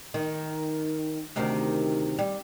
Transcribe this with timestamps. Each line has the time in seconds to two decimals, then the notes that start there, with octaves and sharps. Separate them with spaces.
0.14 D#3
1.36 D2 C3 D#3
2.19 G3